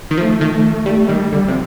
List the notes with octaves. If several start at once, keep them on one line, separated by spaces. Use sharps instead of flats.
D#3
F3 A3
D#3
G3
A3
D#3 G3
D3 G3
C3 F3